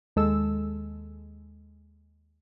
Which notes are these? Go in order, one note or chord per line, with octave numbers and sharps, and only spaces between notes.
D#2 G#3 A4 E6